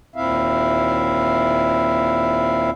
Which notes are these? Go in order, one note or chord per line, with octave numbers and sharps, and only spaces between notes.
D#2 A#2 C4 E4 E5 F5